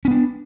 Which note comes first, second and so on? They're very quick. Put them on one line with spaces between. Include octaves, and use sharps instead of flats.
C#4 B3 D4